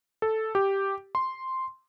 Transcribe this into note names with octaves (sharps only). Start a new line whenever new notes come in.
A4
G4
C6